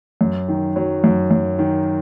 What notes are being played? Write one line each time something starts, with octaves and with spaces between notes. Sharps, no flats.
F#2
D#3
F#3
F#2
F#2
D#3